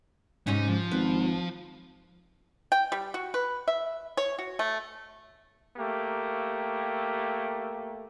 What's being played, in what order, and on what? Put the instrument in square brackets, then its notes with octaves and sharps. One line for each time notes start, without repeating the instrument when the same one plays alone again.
[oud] G#2 C3 C#4 [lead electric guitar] D#4
[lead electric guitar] F3
[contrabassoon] G#1 [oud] B4
[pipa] G5
G3
F#4
B4
E5
C#5
F#4
A3
[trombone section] A3 A#3 G4